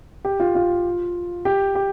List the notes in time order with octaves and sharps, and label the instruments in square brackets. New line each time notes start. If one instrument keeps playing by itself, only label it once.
[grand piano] G4
F4
F4
G4
G4